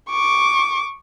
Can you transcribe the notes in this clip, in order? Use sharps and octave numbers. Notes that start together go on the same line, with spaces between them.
C#6 D6